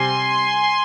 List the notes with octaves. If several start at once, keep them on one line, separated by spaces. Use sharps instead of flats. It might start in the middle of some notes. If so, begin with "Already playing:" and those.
Already playing: C3 G3 G#5 C6